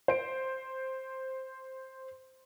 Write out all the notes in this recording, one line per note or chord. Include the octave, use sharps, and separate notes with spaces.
C5 D7